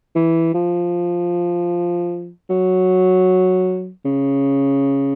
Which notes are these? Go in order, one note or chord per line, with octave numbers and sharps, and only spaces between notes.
E3
F3
F#3
C#3